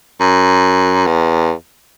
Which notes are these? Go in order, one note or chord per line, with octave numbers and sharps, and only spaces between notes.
F#2
E2